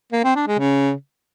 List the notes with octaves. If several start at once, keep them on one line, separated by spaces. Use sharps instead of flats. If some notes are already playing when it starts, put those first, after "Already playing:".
A#3
C4
D4
G#3
C#3